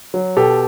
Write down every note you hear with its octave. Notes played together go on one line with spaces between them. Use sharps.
F#3
B2 G4 A4